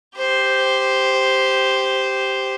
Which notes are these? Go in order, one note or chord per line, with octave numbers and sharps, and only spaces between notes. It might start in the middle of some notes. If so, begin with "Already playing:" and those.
G4 C5